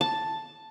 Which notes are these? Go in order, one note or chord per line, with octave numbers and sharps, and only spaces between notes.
A5